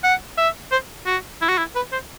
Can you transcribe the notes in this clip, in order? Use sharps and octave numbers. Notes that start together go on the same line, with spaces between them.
F#5
E5
C5
F#4
E4
F#4
E4
B4
C5